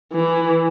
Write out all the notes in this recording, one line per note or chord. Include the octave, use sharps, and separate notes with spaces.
E3